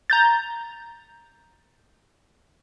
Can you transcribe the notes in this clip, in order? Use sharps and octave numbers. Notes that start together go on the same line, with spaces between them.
A#5 G6 A6